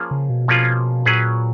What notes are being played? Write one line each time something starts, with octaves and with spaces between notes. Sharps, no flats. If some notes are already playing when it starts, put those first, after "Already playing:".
Already playing: F3 A#3 C#4 F4 G#4
C#3
B2
F3 A#3 C#4 F4 G#4
A#2 F#3 C#4 G#4 B4